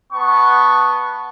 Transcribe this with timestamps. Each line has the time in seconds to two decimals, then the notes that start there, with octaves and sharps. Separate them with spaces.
0.13 B3 A5 C#6